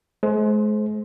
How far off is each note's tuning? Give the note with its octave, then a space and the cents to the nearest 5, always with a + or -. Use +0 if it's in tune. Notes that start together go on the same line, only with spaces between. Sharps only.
G#3 +40 C5 +0